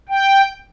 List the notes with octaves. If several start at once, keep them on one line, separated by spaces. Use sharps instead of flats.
G5